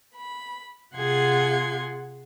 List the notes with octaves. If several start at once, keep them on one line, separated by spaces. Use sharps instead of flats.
B5
C3 F4 G#4 F#5 C6 G#6